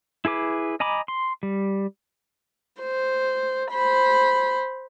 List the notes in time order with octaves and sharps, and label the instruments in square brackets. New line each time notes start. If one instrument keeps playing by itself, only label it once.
[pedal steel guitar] E4 G#4 B4 D6
D#5 G#5 A#5 B5 D6
C6
G3
[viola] C5
C5 B5